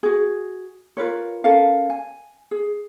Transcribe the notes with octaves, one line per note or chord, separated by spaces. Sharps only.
F#4 G#4
F4 A#4 B4 C#5
C#4 A4 A#4 F5
G#5
G#4